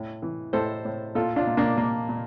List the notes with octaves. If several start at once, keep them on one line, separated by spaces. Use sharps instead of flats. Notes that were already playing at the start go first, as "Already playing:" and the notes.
Already playing: A2
E3
A2 A4 C5
A2
A#2 F4 A4
D4 F4
A#2
A#3 D4
A#2 A#3
A#2